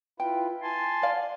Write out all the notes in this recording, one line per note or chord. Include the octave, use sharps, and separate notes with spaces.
E4 F4 B4 G5
G#5 A5 C6
D5 F5